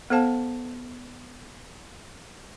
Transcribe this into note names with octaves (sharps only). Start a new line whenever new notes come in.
B3 A4 C5 F5 A5